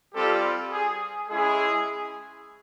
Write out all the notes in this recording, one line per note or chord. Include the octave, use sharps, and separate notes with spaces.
G3 C4 F4 G4 A4
G#4
G#3 C#4 E4 G#4